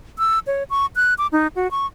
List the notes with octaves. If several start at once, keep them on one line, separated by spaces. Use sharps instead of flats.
E6
C#5
C#6
F#6
D6
D#4
F#4
C#6